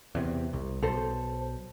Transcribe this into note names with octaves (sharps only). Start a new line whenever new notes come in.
E2 C3
C2
B1 A4 C5